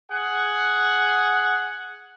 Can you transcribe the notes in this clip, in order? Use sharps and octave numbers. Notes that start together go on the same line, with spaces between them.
G#4 F#5